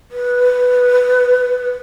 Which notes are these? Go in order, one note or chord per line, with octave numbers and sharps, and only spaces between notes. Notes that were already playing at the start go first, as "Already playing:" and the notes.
B4